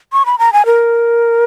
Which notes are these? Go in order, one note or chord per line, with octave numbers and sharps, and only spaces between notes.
C#6
B5
A#5
G#5
A#4